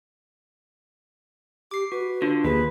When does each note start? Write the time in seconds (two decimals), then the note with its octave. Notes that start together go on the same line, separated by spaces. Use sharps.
1.71 G4 D6 C7
1.92 F#4 B4
2.22 D3 F4
2.44 D#2 G#4 B4